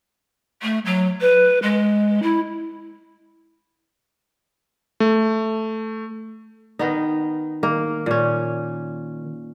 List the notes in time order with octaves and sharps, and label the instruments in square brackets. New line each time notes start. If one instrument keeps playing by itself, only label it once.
[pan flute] A3
F#3
B4
G#3
E4
[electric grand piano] A3
[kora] D#3 B3 D#4
[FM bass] D#3 [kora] A#3
[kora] A#2 C#4